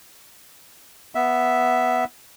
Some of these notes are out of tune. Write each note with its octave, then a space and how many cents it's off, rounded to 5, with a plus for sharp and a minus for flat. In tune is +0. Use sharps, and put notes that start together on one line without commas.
B3 +0 E5 +0